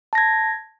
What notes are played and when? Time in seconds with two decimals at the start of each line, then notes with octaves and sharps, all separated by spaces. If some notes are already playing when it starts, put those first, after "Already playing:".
0.13 A5
0.15 A#6
0.18 G#6